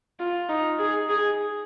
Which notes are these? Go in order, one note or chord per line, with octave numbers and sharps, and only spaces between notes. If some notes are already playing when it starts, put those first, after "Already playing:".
F4
D#4
G#4
G#4